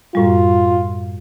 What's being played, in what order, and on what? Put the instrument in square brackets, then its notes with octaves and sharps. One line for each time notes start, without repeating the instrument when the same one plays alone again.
[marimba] F#2 A2 G3 [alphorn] F4